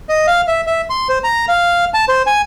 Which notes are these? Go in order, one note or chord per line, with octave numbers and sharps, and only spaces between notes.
D#5
F5
E5
E5
C6
C5
A#5
F5
A5
C5
G#5